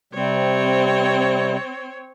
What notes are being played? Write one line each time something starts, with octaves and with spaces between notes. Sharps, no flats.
C3 G3 C4 C#5